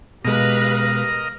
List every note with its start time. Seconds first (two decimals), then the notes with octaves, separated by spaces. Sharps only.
0.25 B2 G#3 G4 A#4 B4 D#5 F5